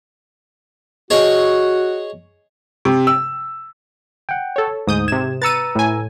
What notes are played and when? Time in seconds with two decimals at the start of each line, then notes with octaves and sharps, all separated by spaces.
1.10 F#4 G#4 C#5 D#5
2.85 C3
3.07 E6
4.29 F#5 G5
4.56 A4 C#5
4.87 D2 G#2 D#6 G6
5.08 C3 G#6 E7
5.42 B4 A#5 E6 A6 C#7 D#7
5.75 A2 G#5